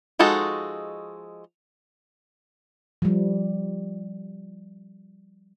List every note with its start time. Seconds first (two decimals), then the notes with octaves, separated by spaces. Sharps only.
0.19 F3 G#3 D#4 F#4 A4
3.02 F3 G3